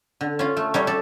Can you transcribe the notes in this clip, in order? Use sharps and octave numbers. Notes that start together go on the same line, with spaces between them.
D3
C#4 F4
A3
G3 D#4 C#5
A4 D5